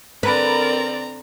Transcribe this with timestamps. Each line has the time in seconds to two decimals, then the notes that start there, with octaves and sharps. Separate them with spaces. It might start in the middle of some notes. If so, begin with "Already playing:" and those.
0.23 D3 C4 A#4 B4 D5 A#5